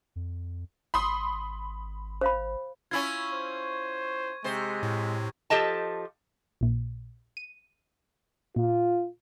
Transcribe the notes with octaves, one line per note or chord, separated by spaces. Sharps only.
F2
G#1 B5 C6 D#6
C5 F5 B5
C#4 E4 F4 C#6 G#6
C5
C3 G#3 C5
A2
F3 G4 A4 D#5 A5
A#1 A#2
D#7
A#2 F4